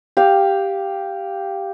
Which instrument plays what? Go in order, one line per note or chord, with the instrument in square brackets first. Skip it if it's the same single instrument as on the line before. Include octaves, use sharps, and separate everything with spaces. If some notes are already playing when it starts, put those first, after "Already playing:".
[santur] G4 F5